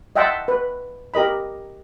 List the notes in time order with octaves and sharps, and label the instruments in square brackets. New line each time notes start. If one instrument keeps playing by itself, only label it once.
[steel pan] D#5 E5 F#5 G5 A5 C6
B4
G4 A#4 D#5 B5